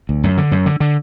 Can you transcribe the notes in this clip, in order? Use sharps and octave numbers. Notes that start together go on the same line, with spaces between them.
D2
F#2
D3
F#2
D3
D3